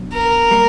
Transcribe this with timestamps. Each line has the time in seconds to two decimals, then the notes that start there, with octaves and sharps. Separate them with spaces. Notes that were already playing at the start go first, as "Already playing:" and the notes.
Already playing: B2 F#3 D4
0.13 A#4
0.51 G3 A#3